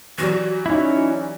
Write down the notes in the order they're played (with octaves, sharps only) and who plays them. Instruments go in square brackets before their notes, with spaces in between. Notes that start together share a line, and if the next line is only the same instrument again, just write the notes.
[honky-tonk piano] E3 F#3 G3 [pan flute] F#4
[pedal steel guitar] C#4 E4 [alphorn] D#4